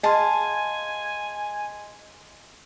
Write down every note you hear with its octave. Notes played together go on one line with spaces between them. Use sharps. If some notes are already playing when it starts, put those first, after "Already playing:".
G#4 D#5 F5 G#5 A5 C6